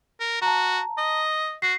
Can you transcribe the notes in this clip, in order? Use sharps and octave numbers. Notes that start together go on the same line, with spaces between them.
A#4
F#4 A5 A#5
D#5
F#4 C7